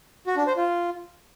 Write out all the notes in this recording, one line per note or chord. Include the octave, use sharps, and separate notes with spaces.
F#4
D4
C5
F4